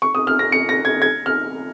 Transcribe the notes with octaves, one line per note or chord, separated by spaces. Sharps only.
C#6
D#6
F6
A#6
C#7
A#6
G#6
G#6
F6